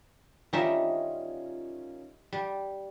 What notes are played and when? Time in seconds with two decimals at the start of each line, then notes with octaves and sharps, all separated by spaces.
0.53 D#3 G3 C#4 D#4 F4 E5
2.33 G3